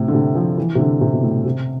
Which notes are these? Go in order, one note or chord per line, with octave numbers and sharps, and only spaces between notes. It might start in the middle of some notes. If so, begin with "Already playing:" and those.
Already playing: A2 C3
D3
C3
F3
E3
C3
D3
C3
B2
A2
C3